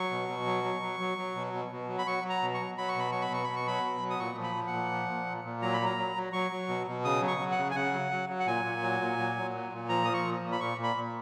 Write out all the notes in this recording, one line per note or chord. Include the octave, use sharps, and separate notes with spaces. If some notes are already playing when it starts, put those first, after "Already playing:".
Already playing: F#3 C#6
B2
B2
F#3
F#3
F#3
F#3
F#3
B2
B2
B2
F#3
B5
F#3 C#6
F#3
A#5
B2
C#6
F#3
F#3 B5
C#6
B2 B5
F#3 C#6
B5
B2 C#6
B2 B5
C#6
F#3 B5
B2
F#3
D#6
A#2 C#6
F3
B5
F3
F#5
A#2
F3
A#2
A#2
A#2
F#3 A#5
B5
F#3 A#5
F#3
F#3
F#3 C#6
F#3
B2
B2
C#3 D#6
F#3
C#6
F#3
F#5
C#3
G#5
C#3 F#5
F#3
F#3
F#3
F#5
A#2 G#5
A#2
F#3
A#2
F#3
F#3
A#2
A#2
F3 A#5
F3 D#6
C#6
A#2
A#2
B5
A#2 C#6
A#2
B5
A#2